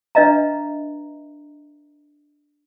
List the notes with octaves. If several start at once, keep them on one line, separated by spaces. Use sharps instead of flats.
D4 B4 D#5 E5 A#5